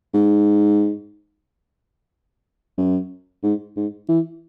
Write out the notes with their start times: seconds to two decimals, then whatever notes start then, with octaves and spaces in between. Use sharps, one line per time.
0.14 G#2
2.78 F#2
3.43 G#2
3.77 G#2
4.09 E3